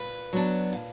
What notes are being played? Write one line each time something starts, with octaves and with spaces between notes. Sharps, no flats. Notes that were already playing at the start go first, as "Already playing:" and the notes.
Already playing: A#2 B4
F#3 B3 D4
A#2